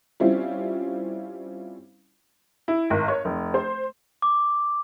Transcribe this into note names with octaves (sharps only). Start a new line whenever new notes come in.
G3 C4 C#4 E4 F4
E4
G#1
C#5
F1
C5
D6